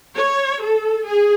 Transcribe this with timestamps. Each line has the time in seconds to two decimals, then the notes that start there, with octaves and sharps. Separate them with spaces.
0.15 C#5
0.61 A4
1.05 G#4